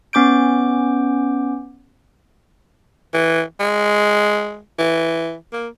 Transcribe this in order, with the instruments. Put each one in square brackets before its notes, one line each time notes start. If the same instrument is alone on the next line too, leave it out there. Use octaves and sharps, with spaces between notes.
[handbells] B3 C#4 D6 G6 D7
[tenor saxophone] E3
G#3
E3
A#3